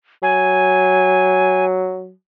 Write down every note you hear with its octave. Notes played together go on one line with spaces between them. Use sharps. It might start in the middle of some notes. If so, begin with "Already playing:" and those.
F#3 G#5